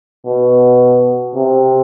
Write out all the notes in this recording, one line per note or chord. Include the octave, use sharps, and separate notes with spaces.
B2
C3